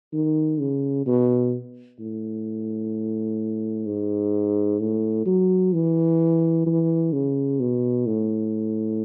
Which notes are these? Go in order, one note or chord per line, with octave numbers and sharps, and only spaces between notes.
D#3
C#3
B2
A2
G#2
A2
F#3
E3
E3
C#3
B2
A2